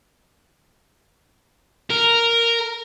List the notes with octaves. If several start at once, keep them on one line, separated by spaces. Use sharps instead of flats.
A#4